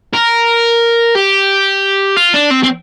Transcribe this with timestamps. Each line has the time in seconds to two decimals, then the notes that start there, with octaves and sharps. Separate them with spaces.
0.13 A#4
1.15 G4
2.17 F4
2.34 D4
2.51 C4
2.64 C4